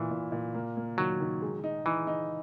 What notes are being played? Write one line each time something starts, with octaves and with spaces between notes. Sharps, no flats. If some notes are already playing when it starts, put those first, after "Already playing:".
Already playing: A#2 E3 E4
A#2
A#2
A#3
A#3
D#3 F#3
D#3
G#3
D#4
E3 D#4
D#4